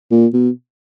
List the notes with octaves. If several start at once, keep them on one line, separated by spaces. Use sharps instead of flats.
A#2
B2